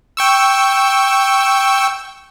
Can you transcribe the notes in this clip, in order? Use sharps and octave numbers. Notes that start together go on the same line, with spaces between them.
G5 C#6 E6